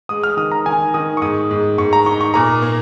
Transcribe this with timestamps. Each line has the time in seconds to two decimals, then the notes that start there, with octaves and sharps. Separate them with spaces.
0.09 G#3 D#6
0.23 F6
0.37 D#3 D#6
0.52 A#5
0.66 D#3 G#5
0.94 D#3 D#6
1.17 C#6
1.22 G#2 D#6
1.51 G#2
1.78 G#2 C#6
1.93 A#5
2.06 D#4 C#6
2.21 C#6
2.34 A#2 A#5
2.62 A#3